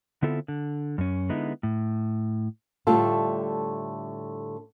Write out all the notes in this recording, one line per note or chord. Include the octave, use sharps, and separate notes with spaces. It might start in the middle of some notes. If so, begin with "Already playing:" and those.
D3 B3 C4 E4 F4 A4
D3
F#2 C#4
D3 G#3 B3 D#4 E4
A2
A2 D3 G3 A3 F4 A4